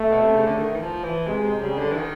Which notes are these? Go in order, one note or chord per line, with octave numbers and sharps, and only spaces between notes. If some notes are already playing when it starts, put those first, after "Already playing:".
Already playing: A3
B2
C3
C#3
D3
D#3
E3
F3
E3
C3 G#3
C3
C#3 G3
D3
E3
D#3